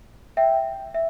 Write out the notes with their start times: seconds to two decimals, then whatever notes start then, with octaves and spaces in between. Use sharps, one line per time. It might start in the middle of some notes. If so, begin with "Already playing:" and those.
0.37 E5 G5
0.95 E5